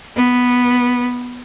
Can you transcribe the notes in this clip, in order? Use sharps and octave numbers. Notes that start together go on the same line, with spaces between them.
B3